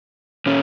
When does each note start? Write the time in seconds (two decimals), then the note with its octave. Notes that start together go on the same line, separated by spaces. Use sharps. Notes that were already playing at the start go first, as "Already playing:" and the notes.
0.46 A#2 C#4